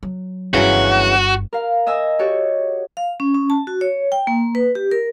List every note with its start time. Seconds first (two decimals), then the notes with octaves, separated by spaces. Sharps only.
0.03 F#3
0.54 G1 G2 C#3 E3 F#3 F#4
1.53 A#4 F5
1.86 D#5 E5 G#5 E6
2.19 F#4 G4 A4 C#5
2.97 F5
3.20 C#4
3.35 C#4
3.50 A5
3.67 F#4
3.81 C#5
4.12 G5
4.27 A#3
4.55 B4
4.75 G4
4.91 A#4